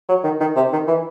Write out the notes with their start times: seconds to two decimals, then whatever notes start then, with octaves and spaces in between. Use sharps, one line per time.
0.08 F#3
0.24 D#3
0.41 D#3
0.56 C3
0.72 D#3
0.88 E3